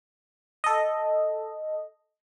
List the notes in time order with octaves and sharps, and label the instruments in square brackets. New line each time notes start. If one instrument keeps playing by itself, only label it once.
[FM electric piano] A4 D#5